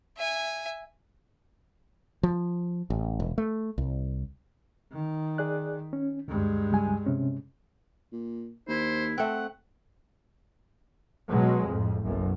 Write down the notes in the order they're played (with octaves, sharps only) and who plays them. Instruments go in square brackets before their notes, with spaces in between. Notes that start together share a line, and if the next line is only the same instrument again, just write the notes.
[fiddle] E5 G#5
[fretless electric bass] F3
A1
E1
A3
C2
[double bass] D#3
[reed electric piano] G#4 D5 F#6
C#4
[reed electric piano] D2 [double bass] G2 G#3
[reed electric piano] C#2 G3 G#5
C3 C#4
[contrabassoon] A#2
[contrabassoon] D#2 [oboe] E4 [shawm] C5
[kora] A3 C4 [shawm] F#5
[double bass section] B2 F#3 G#3
F2 A2
F#1 B1 F#2